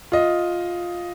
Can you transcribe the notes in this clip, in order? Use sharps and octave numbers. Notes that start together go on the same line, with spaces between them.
F4 D#5